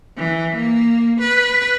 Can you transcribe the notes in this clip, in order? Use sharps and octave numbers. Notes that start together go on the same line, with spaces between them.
E3
A#3
B4